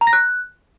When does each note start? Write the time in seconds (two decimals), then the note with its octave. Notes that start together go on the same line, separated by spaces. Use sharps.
0.01 A#5
0.07 A#6
0.13 F#6